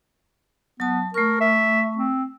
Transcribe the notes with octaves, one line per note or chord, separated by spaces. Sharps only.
F#3 B3 A5
A3 A#4 C#6
E5
C4